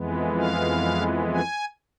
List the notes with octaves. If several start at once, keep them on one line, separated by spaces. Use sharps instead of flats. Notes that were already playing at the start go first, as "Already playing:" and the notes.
Already playing: F2 E3 G#3 B3
F5
G#5